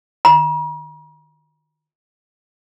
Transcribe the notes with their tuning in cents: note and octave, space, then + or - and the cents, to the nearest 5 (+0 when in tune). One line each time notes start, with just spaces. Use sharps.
A#5 +45